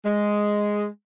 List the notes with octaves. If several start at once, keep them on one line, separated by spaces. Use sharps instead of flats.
G#3